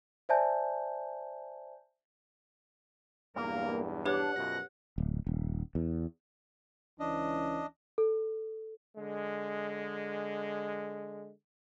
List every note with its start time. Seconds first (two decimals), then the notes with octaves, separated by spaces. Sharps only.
0.29 C5 D5 E5 G#5 A5 G6
3.36 B1 E2 G2 A#3 A#4
4.05 D4 G4 B4 C#5 F#5
4.36 F#2 B2 F3 A#6
4.98 D1
5.27 D#1
5.75 E2
7.00 C#2 E3 C#4 D4 D#5
7.98 A4
8.97 D3 G#3